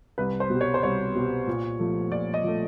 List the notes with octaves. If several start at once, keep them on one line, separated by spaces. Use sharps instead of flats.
C2 B4
C5
B2 G3
C#5
C5
C2 C#5
B2 G3
A#2
F3 A3
A#2 D5
D#5
F3 A3